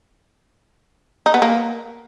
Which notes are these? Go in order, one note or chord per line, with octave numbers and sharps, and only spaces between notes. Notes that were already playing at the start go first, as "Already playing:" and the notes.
D#4
B3
A#3